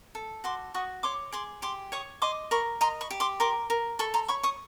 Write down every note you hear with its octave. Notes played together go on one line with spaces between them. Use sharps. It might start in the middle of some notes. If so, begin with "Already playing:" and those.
A4
F#4 C6 D6
F#4 C#6 D#6
C#5 C6 D6
G#4 C6 D6
G4 C6 D6
C#5 C#6 D#6
D#5 C6 D6
A#4 B5 C#6
D#5 A#5 C6
B5 C#6
G4
C6 D6
A#4 C6 D6
A#4
A4 B5 C#6
A#5 C6
C#5 B5 C#6
C#6 D#6